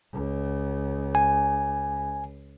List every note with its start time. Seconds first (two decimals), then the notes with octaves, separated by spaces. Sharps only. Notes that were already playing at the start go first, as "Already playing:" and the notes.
0.13 C#2
1.15 G#5